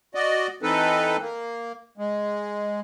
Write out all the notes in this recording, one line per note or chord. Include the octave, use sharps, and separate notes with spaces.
F#4 D5 D#5
E3 C4 D#4 A4 B4
A#3
G#3